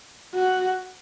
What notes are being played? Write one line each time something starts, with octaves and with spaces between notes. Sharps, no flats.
F#4